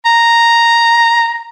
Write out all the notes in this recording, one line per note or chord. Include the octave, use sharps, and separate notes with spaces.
A#5